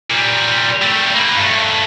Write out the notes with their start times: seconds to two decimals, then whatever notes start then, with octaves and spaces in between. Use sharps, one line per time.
0.10 A#2 G3
0.82 G3 A3
1.15 A#3 B4
1.36 G2 A3